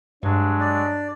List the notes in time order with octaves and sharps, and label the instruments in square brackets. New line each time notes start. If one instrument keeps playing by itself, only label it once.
[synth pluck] G2 [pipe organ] F#3 G#3 [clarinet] D4
[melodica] D5